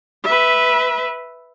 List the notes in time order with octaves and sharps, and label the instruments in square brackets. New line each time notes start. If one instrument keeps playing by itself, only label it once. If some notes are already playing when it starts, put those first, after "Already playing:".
[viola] B4 E5